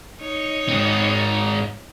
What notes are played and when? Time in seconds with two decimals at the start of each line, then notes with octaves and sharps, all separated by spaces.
0.22 D#4 C#5
0.69 G#2 C4